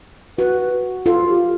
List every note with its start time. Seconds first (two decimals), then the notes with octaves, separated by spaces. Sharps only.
0.38 F#4 B4
1.05 F4 A4
1.29 G4